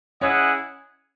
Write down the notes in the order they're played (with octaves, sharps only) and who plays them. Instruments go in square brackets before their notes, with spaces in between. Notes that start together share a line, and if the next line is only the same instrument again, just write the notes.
[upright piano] C#4 C#5 [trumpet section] E4 G#4 D#5 F#5